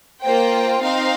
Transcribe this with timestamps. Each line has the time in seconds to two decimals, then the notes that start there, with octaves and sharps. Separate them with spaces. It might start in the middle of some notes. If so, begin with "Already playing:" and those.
0.23 A#3 F4 C5 G5
0.82 C4 D#4 C5 F5